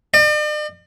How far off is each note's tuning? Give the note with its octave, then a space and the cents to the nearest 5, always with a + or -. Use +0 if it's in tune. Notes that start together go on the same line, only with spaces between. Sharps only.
D5 +45